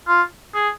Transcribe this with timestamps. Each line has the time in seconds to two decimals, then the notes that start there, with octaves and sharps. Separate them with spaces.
0.08 F4
0.55 G#4